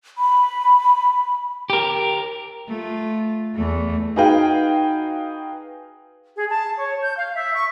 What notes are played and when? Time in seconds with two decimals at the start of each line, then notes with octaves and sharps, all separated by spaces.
0.18 B5
1.70 G4 A#4
2.68 A3 F4
3.55 E2 A3
4.16 D#4 F#4 G#4 B4 F5 G5
6.37 G#4
6.50 A5
6.77 C#5
7.01 G6
7.16 F5
7.35 E5
7.55 C#6